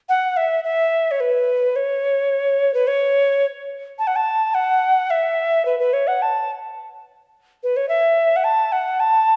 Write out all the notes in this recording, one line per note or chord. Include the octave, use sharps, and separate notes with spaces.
F#5
E5
E5
C#5
B4
C#5
B4
C#5
A5
F#5
A5
F#5
E5
B4
B4
C#5
F#5
A5
B4
C#5
E5
F#5
A5
F#5
A5